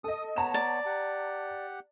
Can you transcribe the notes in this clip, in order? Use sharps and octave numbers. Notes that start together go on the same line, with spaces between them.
A4 D#5 D#6
B3 C#5 A5 A#5 E7
D5
G4 F#5